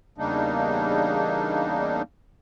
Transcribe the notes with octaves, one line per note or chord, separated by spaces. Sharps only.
E2 C#3 G3 A#3 D4 D#4